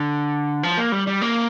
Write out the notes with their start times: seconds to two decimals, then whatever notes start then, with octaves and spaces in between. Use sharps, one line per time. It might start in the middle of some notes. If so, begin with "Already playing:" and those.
Already playing: D3
0.63 F3
0.78 A#3
0.92 G3
1.07 G3
1.22 A#3